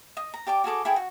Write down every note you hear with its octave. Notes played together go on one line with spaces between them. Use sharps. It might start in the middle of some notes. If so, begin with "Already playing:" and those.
D#5
A#5
G4 D5 A5 D6
F#4 G#4 A4 D6
E4 G#4 A4 G5
F#4